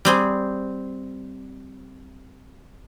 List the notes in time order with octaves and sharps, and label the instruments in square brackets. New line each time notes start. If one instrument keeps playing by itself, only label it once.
[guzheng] G3 C4 G#4